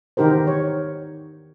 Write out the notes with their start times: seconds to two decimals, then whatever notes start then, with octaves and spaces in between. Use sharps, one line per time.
0.17 D#3 E3 D#4 G4 A#4 C5
0.47 C#5